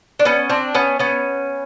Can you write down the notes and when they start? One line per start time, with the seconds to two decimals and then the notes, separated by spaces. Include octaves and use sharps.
0.19 D4
0.25 B3 C#4
0.49 C4 D4
0.75 B3 C#4
0.99 B3 C#4